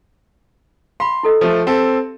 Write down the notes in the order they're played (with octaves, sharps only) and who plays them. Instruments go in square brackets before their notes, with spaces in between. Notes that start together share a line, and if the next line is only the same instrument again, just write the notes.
[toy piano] F5 B5 [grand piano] C6
[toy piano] E4 A4 D#5
[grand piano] F3 A3
[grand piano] C4 A4 [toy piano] G4 F5